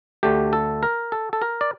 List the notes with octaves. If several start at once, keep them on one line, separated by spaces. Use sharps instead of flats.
D2 D3 A3 G4
A4
A#4
A4
A4
A#4
D5